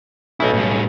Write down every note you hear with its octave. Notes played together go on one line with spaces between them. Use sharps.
B1 C#3 A3 E4
A2 G3